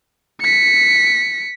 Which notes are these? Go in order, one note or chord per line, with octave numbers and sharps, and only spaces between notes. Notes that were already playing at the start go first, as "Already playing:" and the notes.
B6 C#7